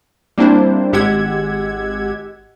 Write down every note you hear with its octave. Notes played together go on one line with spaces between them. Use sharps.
G3 A#3 C4 D4 E4 C5
G#1 G#3 G4 F#5 E6 G#6